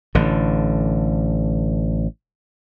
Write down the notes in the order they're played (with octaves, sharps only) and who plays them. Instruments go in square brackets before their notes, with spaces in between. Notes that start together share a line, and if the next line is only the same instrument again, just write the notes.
[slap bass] A1 D3